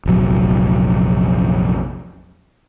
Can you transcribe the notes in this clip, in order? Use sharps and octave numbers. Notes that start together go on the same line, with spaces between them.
F1 A#1 F#3